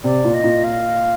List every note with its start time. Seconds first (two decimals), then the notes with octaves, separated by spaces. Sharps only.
0.04 C3 D5
0.24 A#2
0.34 D#5
0.44 A#2
0.64 F5